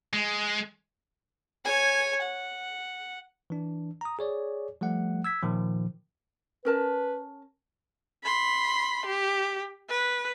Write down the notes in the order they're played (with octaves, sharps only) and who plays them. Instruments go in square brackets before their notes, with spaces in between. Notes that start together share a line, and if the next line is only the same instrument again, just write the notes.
[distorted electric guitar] G#3
[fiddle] C#5 G#5
F#5
[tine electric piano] E3 D4
A#5 D#6
G#4 C#5 D5
F3 G3 A3 F#5
E6 G#6 B6
A#2 D#3 F3
[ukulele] C#4 A#4 A5 [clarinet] B4
[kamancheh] B5 C6
G4
B4